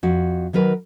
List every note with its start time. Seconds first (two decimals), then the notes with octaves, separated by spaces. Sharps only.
0.03 F2 F#4
0.53 D#3 F#3 A#4 B4